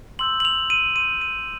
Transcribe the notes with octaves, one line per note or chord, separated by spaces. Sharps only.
C6 E6 G6 F#7
F#7
F7
D#7
C6 E6 G6 D#7
D#7